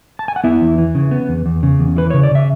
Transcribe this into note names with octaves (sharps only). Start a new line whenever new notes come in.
A5
G#5
F#5
B3 E4 E5
E2
E3
C#3
B3
E2
E2
C#3
E2
E3 B4
C#3 C#5
D5
C#3 E5